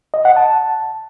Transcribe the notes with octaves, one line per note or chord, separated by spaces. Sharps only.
D#5
F#5
A5